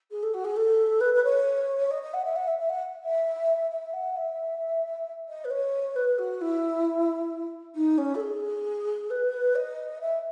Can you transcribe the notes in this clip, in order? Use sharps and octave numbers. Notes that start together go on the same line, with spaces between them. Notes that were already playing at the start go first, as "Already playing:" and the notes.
G#4
A4
F#4
G#4
A4
B4
B4
C#5
D#5
D#5
F#5
E5
F#5
E5
E5
F#5
E5
E5
F#5
E5
D#5
B4
C#5
B4
F#4
E4
D#4
C#4
A4
G#4
B4
D#5
E5